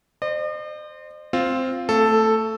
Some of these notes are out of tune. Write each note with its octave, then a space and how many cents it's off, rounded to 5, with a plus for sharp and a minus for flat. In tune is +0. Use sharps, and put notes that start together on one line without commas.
C5 +5 D#5 -45
C4 +0 F4 +0
A3 +25 A4 +0